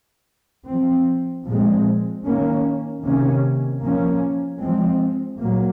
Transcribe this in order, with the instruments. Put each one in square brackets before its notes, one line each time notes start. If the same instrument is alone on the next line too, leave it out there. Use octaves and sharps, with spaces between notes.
[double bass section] F3 C4
A#2 F3 G#3 C4
D#3 A#3 C#4
C3 D#3 A#3 C#4
F3 A#3 C#4
F3 G#3 C4
A#2 F#3 A#3